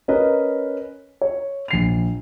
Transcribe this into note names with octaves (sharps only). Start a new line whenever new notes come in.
C#4 A#4 B4 D#5
C#5
A#1 C7 F7